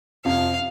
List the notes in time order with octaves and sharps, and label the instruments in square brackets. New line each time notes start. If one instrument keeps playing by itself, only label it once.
[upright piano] F2 C3 F3 [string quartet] F5